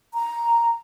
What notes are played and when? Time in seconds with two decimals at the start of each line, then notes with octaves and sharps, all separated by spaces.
0.14 A#5